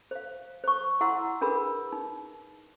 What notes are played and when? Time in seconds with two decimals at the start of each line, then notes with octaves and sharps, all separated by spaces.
0.11 C5 F5
0.64 C5 C#6
1.01 E4 F#5 A#5 C6 E6
1.41 D4 G#4 A#4 B4 B5 E6
1.92 D#4